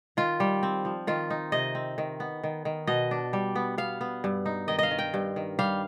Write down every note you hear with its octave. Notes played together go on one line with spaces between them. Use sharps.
D#3 F4
G3
C4
F3
D#3 F4
D#4
C3 D#5
C4
D#3
B3
D#3
D#3
B2 D#5
D4
G3
B3
B3 F5
B3
G2
D#4
D#3 D#5
D#5 F5
D#3
G5
G2
D#3
G3 F5